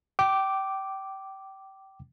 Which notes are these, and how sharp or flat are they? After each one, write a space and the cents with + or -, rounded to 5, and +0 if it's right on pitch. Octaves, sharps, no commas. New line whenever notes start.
G5 -25 D6 +0